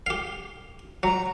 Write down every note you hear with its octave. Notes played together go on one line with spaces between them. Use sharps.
G4 F5
F#3 A#5